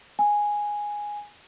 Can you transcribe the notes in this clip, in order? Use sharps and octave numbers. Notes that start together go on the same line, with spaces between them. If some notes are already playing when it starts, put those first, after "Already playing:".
G#5